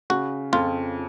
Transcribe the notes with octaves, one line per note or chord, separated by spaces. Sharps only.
C#3 F#4
F2 F4